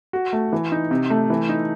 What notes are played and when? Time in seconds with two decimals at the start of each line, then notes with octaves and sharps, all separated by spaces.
0.13 F#4
0.33 A3
0.53 E3
0.72 D#4
0.91 C3
1.10 A3
1.30 E3
1.49 D#4